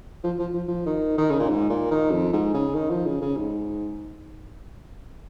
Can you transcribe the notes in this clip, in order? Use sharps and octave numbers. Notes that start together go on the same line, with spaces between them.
F3
F3
F3
F3
D#3
D#3
C#3
A#2
G#2
A#2
D#3
F2
G#2
C#3
D#3
F3
C#3
C#3
G#2